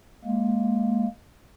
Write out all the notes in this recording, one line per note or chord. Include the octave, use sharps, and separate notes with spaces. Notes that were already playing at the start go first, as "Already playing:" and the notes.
G#3 A#3